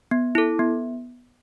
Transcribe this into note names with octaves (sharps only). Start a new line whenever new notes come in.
B3
E4 A4
B3